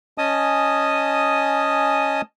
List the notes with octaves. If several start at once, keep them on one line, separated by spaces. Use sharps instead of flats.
C#4 D#5 G#5 A5 D#6